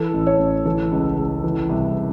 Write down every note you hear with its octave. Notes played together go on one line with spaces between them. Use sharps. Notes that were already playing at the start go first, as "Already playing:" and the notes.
Already playing: E3 A4
A1
C#5
A1
E3 A4
C#2
C#2
E3
C2